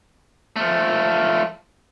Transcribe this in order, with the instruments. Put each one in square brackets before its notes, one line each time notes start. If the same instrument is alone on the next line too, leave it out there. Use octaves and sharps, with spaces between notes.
[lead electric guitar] F3 A3